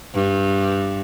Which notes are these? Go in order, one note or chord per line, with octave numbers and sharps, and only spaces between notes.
G2